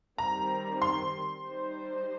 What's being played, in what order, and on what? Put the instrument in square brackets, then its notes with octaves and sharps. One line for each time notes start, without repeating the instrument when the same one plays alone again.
[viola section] D#3 G3 C4 [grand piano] A#5
[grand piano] C6
[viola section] G3 D#4 C5